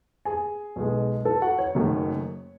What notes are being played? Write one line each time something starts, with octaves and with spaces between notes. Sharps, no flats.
G#4 G#5
B1 B2 G#3
A4 A5
F#4 F#5
C#5
F#1 F#2 D#3 A3